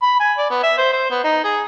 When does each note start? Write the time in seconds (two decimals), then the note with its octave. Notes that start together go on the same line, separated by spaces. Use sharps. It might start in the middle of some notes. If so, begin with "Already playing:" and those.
0.02 B5
0.20 G#5
0.38 D5
0.50 B3
0.63 E5
0.78 C5
0.93 C5
1.11 B3
1.24 D#4
1.44 G#4